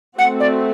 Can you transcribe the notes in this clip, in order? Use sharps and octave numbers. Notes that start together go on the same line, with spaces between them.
A3 C4 F#4 F#5
D5